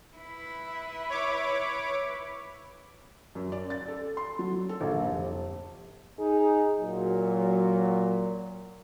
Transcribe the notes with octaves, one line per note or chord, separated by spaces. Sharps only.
E4 B4
C#5 D6
F#2
D5
A6
A4
C6
F#3
A4
A#1
F1
D#4 G#4
A#2 F#3